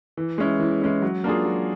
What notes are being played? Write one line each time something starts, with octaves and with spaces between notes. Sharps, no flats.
E3
G#3 C#4 E4
E3
G#3 C#4 E4
F#3
A#3 D4 F4 G#4
F#3